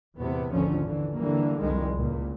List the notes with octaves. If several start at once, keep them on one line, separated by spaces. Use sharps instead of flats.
E2 A2 C3 B3
G#1 D#2 D3 F3 C#4
D3 E3
D3 E3 G3 A#3
C2 F2 D#3 G3 G#3
C#2 A#2